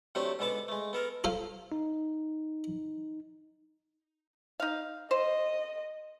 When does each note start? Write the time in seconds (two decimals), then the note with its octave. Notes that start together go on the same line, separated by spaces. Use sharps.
0.15 C3 F#3 A3 C4 D4 G4
0.39 G#2 D3 B3 A4 D5 A5
0.68 G#3 A3
0.93 B3 A4 A#4
1.24 F4 A4 C5
1.72 D#4
4.60 D#4 F5
5.11 C5 D#5